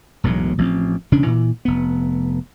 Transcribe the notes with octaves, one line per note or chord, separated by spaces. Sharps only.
E1 B1 A2 F#3
A1 F3 C4
E1 C#3 C#4 D4
A#2 E3
F1 B3